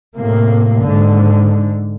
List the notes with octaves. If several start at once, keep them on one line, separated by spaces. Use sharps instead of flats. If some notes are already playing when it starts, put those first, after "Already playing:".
A2 C3 A#3
G#2 D3